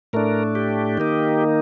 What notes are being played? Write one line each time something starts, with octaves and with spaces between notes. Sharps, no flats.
A2 A3 D4 A#4
G4
D#3 A#3 D#4